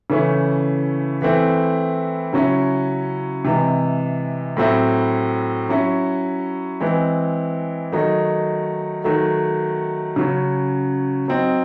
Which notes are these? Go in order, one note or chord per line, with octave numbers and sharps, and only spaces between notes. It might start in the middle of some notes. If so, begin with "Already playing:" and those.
C#3 E3 A3 C#4 E4
E3 A3 C4 E4
C#3 F#3 C#4 E4
C3 E3 G#3
A2 F#3 C4 E4
F#3 C#4 E4
E3 G#3 C4
D#3 F#3 A3 D#4
D#3 F#3 A3
C#3 F#3 C#4
F#3 C4 D#4